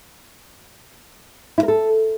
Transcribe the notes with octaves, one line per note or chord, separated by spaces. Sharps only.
E4
A#4
A4